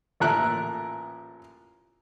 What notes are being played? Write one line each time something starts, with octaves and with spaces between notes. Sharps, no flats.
A1 A#2 A4 A#4 E5 F#6